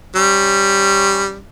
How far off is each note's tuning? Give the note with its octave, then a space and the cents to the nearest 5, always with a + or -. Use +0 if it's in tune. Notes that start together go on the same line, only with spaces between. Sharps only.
G3 +0 C#4 -15